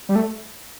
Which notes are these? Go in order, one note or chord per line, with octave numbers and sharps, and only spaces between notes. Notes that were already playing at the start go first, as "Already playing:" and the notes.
G3
A3